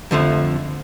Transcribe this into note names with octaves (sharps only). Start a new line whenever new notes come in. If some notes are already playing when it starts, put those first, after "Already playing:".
F2 D3 F3 A3